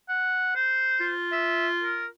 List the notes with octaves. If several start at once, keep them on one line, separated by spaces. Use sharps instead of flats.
F#5
C5
F4
E5
A#4